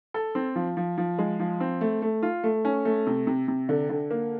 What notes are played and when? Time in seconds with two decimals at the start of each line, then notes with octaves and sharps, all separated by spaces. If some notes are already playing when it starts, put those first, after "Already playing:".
0.14 A4
0.35 C4
0.56 F3
0.77 F3
0.98 F3
1.19 G#3
1.40 F3
1.60 C4
1.81 A3
2.02 A3
2.23 F4
2.44 A3
2.65 C#4
2.85 A3
3.07 C3
3.27 C3
3.48 C3
3.69 D3
3.90 D3
4.11 A#3